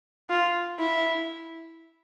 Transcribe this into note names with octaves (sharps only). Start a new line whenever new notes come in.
F4
E4